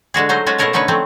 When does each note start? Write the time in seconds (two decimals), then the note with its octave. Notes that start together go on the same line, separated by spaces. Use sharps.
0.14 D3 G#3 F#4 G#4
0.29 F#3 A3 D#4 C5
0.46 G#3 C#4 F4 F#4
0.58 B2 A3 G#4 A#4 C#5 A5
0.73 D3 A3 C#4 D#4 B4 C#5
0.88 F3 F#3 A3 C4